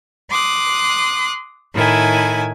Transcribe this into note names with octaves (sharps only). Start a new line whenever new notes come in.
C6 D6 D#6 F#6
A2 D#3 E4 G#5